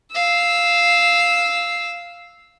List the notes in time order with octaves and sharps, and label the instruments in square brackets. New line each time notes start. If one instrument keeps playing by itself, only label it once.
[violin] F5 E6